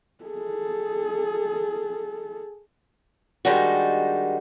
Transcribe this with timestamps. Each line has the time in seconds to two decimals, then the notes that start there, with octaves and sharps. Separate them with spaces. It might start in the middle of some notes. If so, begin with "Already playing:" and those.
0.24 G#4 A4
3.45 D#3 G3 G#3 D4 D#4 F#4